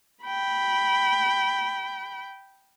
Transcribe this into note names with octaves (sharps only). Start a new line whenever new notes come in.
G5 B5